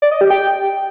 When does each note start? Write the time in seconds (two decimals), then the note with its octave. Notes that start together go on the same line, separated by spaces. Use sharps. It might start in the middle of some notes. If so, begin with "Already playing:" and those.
0.02 D5
0.11 D#5
0.21 G4
0.30 G5